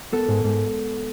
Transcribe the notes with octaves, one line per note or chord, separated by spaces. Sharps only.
B3 A4
G#2
G#2